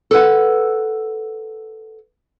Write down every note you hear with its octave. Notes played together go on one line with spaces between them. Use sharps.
A4 B4 F#5